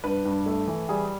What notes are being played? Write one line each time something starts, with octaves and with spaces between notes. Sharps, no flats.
G2 B4
G2
A3
E3
G3 G#4